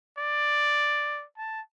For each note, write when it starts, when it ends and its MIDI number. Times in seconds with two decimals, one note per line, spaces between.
0.18 1.24 74
1.37 1.60 81